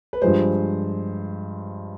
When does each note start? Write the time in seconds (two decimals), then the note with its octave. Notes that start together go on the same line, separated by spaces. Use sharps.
0.13 B4
0.22 G2 F3 G#3 C5